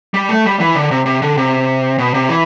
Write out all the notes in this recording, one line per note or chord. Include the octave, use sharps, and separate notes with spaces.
G3
A3
G3
E3
D3
C3
C3
D3
C3
B2
C3
E3